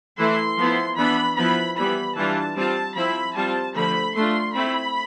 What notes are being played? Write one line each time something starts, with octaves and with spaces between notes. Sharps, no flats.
E3 A3 E4 C6
F3 B3 E4
E3 B3 D4 B5
F3 B3 E4 B5
E3 G3 B3 B5
E3 G3 D4 F4 A5
G3 C4 F4 A5
F3 C4 E4 B5
G3 C4 F4 A5
D3 F3 A3 B5
A3 D4 F4 C6
A3 C4 E4 B5